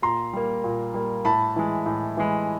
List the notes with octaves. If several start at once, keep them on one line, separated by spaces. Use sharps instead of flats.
A#2 A#5 C6
G3 A#3
A#2
G3 A#3
A2 A5 B5
E3 G#3
A2
E3 G#3